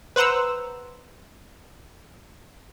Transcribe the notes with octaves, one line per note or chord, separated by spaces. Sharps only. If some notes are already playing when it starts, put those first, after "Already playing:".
B4 C5 F#5 A#5 E6